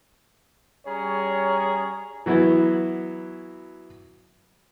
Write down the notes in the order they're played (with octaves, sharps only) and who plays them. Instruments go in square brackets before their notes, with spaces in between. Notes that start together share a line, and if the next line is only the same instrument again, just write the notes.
[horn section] G3 C#4 G#4 C#5 A#5
[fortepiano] E3 F#3 B3 E4 F#4